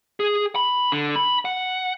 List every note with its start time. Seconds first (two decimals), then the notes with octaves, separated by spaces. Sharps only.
0.20 G#4
0.56 B5
0.92 D3
1.16 B5
1.45 F#5